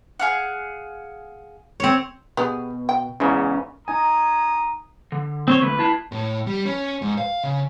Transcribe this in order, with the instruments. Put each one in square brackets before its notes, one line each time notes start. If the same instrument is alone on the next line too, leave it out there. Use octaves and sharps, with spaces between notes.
[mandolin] G#4 F5 F#5
[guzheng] C4 C#5
[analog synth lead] B2 [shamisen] B3 G4 G#4
[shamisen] G5
[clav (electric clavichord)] E2 G#2 C#3 [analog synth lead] C#4
[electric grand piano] D#4 G#5 [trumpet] A#5 [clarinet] D#6
[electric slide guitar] D3
[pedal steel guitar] C4 C5 C#5
[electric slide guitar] D3 A3 [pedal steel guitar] B4
[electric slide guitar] E4 A5
[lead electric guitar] A2
G3
C#4
G#2
F5
C#3